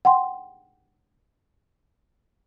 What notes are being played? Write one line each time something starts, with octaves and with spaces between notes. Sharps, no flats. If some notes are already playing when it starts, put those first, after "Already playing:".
F#5 G5 C6